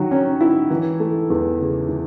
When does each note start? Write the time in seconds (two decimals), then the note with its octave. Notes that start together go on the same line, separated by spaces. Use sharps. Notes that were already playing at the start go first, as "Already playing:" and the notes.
Already playing: D#3 F#3
0.11 C#4
0.41 E4
0.70 E3
1.00 A3
1.30 E2
1.59 C#3
1.89 E3